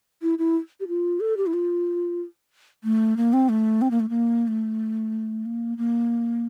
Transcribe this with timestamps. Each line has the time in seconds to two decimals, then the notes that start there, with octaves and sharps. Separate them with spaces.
0.22 E4
0.39 E4
0.80 G4
0.88 F4
1.20 A4
1.37 G4
1.46 E4
1.53 F4
2.84 A3
3.17 A#3
3.33 C4
3.49 A3
3.82 C4
3.91 A#3
4.00 A3
4.09 A#3
4.48 A3
5.45 A#3
5.78 A#3